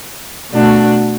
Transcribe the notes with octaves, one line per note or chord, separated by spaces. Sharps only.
B2 A3 D4 F#4